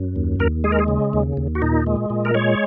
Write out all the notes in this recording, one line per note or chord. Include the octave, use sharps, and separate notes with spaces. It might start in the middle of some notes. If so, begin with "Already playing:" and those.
Already playing: F#2
D#2
D#2 A#4
G#3 G#4
A#4
G#4
C#3
D#2
D#2
F#4
A#2 D#4
G#3
A#2
A#4
G#3 C#5